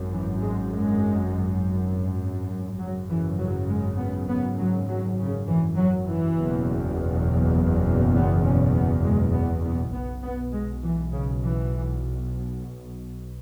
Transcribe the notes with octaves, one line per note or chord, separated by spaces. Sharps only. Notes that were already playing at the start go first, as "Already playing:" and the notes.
Already playing: G#1 F#2
E3
G#3
G#3
G#1 F#2 C#3 F#3
E3
F#3
G#3
B3
B3
F#3
F#3
C#3
E3
F#3
E3
F#1 E2 B2
B3
C#4
B3
G#3
B3
B3
B1 B2 B3
B3
G#3
E3
C#3
E3